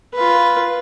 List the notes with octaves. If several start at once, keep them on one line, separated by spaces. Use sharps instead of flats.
F4 B4